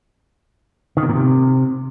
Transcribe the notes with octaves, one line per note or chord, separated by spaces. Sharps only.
D#3
C3
A#2
C3